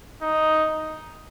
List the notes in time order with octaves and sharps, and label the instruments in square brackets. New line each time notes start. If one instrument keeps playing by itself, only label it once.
[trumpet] D#4